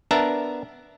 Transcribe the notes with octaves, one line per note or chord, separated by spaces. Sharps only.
B3 D4 A#4 E5 A5 A#5